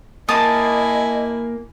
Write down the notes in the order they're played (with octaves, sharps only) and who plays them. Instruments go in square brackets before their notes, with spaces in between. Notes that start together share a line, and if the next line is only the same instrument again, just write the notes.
[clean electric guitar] A#3 [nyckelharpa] E4 G#5 [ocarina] D#5 [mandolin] A5 D#6